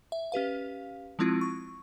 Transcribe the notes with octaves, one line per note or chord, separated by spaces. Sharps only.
E5
C#4 G4 B4 F5
F3 G#3 C4 E4 F4
C#6